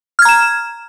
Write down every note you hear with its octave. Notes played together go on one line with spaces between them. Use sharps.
A#5 F6 G#6 E7